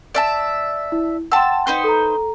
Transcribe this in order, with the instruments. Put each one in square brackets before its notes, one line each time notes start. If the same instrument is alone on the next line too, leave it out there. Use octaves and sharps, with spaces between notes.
[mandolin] D5 E5 A5
[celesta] E4
[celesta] F#5 G5 C6 [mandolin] A5 E6
[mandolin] D#4 B4 C5
[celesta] A4 A#5